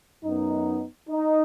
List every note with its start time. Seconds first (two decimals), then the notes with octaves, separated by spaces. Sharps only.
0.24 F#2 F#3 B3 D#4
1.10 D#4